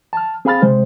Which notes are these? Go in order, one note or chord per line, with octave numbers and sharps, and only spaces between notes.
A5 F6
C4 G#4 F5 B5 F6 A6
C3 G#3 C5